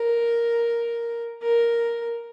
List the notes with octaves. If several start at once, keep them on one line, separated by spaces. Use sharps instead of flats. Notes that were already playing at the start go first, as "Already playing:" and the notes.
Already playing: A#4
A#4